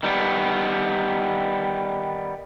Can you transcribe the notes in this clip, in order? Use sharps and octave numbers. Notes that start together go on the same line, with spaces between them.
D#3 G3 B3